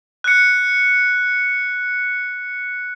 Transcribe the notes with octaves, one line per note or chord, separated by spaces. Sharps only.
F#6 C#7